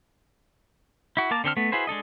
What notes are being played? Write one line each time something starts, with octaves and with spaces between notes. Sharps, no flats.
E4 F#4
A#3 A#4 A5 D6
D3 C4 A4 F6
A3 B3
E4 F#4 G#4 B4 C5
G#3 D4 A4 D#5